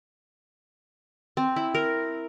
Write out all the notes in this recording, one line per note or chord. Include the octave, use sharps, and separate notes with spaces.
C4
E4
A#4